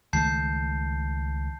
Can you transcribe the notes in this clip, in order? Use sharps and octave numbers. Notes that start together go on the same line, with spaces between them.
C#2 D#3 A3 A5 G6 C7